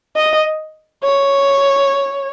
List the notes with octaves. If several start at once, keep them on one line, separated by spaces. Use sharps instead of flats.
D#5
C#5